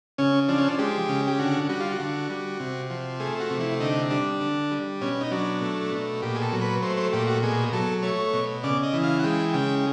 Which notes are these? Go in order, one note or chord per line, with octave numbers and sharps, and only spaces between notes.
C#3 C#4
F3 D4
C#4
D4
G#3 G4
C#3
G4
D3 F#4
G3 F#4
F4
F#4
D3
G3
C3
F3
A3 G#4
F#4
C3
E4
D3 D#4
G3 D4
D3
G3
B2 C#4
D#4
F#3 D4
A3
B2
A#2 G4
G#4
A4
F#3
B4
A3 C5
C5
A#2 G4
F#4
B2 G#4
F#3 A4
A3 C#5
B2
C#3 D5
D#5
E3
F5
F#5
G#3 G5
C#3 G5